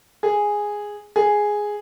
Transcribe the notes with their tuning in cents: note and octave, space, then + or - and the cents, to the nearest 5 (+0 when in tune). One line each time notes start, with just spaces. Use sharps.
G#4 -5
G#4 +0